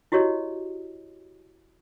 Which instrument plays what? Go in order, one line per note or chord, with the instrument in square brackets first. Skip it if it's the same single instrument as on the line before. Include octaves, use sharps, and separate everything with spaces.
[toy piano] E4 F#4 G4 C#5 D#5